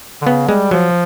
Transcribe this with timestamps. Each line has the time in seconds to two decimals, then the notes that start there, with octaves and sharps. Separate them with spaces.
0.22 D3
0.26 C#3 B3
0.49 G3 G#3
0.71 F3 F#3